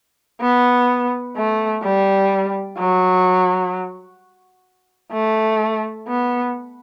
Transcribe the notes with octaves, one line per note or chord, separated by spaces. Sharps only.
B3
A3
G3
F#3
A3
B3